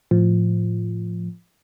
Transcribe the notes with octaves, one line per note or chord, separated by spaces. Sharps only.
A2 F3